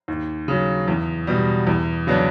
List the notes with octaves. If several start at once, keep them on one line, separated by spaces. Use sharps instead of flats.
D#2
C#3 F#3
E2
B2 G3
E2
C#3 F#3 B3 D4